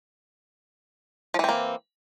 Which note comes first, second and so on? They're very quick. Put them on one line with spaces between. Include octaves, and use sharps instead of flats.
F3 E3 C4 A#3